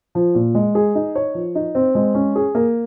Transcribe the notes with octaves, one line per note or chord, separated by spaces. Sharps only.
F3
A#2
G#3
G#4
D#4
C#5
F3
D#4
C4
G#3
C#4
G#4
A#3